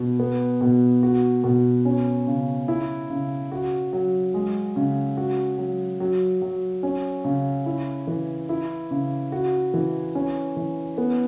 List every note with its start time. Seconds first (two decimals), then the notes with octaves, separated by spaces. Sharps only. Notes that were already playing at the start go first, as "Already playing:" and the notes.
Already playing: B2
0.20 B3
0.61 B2
1.03 F#4
1.44 B2
1.85 C#4
2.27 C#3
2.68 E4
3.10 C#3
3.52 F#4
3.93 F#3
4.34 G#3
4.76 C#3
5.17 F#4
5.58 F#3
6.00 F#3
6.42 F#3
6.83 C#4
7.24 C#3
7.66 E4
8.07 E3
8.49 E4
8.91 C#3
9.32 F#4
9.74 E3
10.15 C#4
10.56 E3
10.98 B3